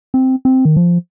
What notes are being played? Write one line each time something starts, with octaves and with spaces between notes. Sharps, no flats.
C4
C4
D#3
F3